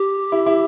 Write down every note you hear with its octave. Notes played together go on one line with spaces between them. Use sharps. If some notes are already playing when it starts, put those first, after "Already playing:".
Already playing: G4
E4
E4